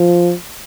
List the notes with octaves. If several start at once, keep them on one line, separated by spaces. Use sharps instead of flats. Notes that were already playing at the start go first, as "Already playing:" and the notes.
Already playing: F3